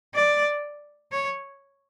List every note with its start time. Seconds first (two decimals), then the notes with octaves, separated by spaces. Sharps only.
0.15 D5
1.12 C#5